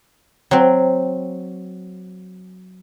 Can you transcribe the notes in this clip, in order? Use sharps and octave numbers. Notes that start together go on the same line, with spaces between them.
F#3 C4